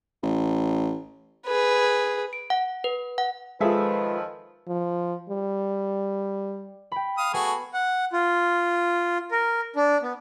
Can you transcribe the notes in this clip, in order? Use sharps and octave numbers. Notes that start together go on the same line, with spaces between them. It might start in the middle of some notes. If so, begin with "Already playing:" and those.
A1
G#4 B4
D7
F#5
B4
F#5
D#3 F3 G#3 F4 G#4 A4 B4 E5
F3
G3
G5 B5
F5 D#6
A3 B3 F#4 G#4
F#5
F4
A#4
D4
B3